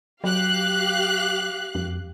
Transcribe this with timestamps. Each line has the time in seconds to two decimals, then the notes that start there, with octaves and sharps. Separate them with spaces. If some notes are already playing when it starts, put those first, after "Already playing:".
0.24 F#3 G4 F5 F#6
1.75 F2